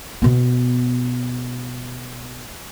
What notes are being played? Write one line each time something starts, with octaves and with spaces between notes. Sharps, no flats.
B2 B3